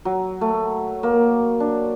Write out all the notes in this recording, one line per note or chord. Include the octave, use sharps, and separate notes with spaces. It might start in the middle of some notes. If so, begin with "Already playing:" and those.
F#3
A3
A#3
D4